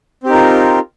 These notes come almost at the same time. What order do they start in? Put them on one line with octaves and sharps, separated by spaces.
C4 G4 D#4 A#4 F4